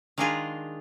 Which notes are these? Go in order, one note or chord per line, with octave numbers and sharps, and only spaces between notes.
D#3 G#3 D4 D#4 F4 G#4